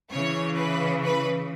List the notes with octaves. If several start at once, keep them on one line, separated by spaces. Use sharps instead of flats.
C#3 E3 C#5
B4
B4